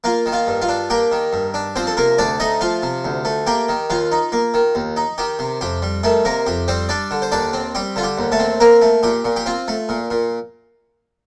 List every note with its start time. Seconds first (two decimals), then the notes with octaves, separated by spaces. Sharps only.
0.04 A#3 F4 F5
0.26 D#3
0.32 F4 F5
0.47 G2
0.62 F4 F5
0.69 D4
0.90 A#3 G4 G5
1.12 D#3
1.33 G2
1.54 D4
1.76 F3 C4 C5
1.87 A4
1.97 C3 A#3 A#4
2.18 D2 D4 D5
2.40 A3 D#4 D#5
2.61 F3 F4 F5
2.82 C3
3.05 D2
3.25 A3
3.47 A#3 G4 G5
3.69 D#3
3.90 D#2 F4 F5
4.12 D#4
4.32 A#3
4.54 D#3
4.75 D#2
4.97 D#4
5.18 D#3 G4
5.39 C3
5.61 F2 G4
5.82 G3
6.03 D#3 A3 A4
6.25 C3 A#3 A#4
6.46 F2 G4
6.68 G3 C4 C5
6.89 G3 D4 D5
7.11 D3
7.22 C5
7.32 D#2 D4 D5
7.53 C4
7.75 G3 G4
7.96 D3 F4
8.03 G4
8.18 D#2
8.32 A3 A4
8.39 C4
8.60 A#3 C4 A#4
8.82 A3
9.03 A#2 G4
9.25 A#2
9.36 G4
9.46 C4 F4
9.68 A3
9.89 A#2
10.10 A#2